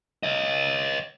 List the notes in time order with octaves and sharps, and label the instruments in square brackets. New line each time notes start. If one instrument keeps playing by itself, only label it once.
[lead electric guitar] C#5 D#5